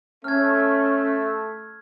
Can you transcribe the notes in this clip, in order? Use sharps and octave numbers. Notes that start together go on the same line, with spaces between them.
A3 C#4 F6 G#6